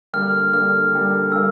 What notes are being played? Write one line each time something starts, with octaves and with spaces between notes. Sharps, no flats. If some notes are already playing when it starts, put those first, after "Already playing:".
D3 G3 A#3 F6
D3 G3 A#3 F6
D3 G3 A#3
D3 G3 A#3 E6